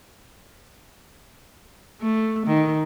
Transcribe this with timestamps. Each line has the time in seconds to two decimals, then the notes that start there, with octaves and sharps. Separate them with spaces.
2.02 A3
2.47 D#3